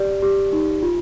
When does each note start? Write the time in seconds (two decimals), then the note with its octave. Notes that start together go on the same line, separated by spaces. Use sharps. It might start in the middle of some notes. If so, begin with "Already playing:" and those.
Already playing: G4 D5
0.23 G4
0.53 D#4
0.83 F4